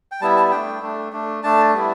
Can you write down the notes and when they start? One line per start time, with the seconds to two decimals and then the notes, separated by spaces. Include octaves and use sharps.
0.12 G5
0.21 G3 B3 E4 A5
0.37 A5
0.52 A3 D4 G5
0.81 A3 D4
1.12 A3 D4
1.43 A3 D4 A5
1.74 G3 B3 E4